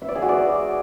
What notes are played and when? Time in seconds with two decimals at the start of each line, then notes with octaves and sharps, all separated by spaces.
0.02 E5
0.08 D5
0.15 G#4
0.22 F#4
0.29 D5